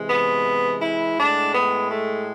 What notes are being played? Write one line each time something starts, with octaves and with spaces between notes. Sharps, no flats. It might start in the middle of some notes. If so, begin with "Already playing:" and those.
Already playing: C3 E3 G#3
B3
E4
A2 G#3 D4
B3
A3